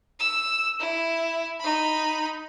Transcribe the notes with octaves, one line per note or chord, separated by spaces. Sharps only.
E6
E4
D#4 B5